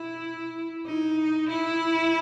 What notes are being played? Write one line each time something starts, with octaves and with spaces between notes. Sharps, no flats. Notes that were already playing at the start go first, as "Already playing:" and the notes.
Already playing: E4
D#4
E4